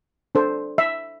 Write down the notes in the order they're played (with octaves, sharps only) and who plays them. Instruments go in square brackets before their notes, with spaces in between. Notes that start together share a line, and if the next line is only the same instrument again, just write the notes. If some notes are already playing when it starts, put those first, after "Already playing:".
[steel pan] D4 A4 C5
E5